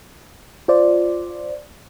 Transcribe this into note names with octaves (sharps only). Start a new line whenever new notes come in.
F4 C5 D5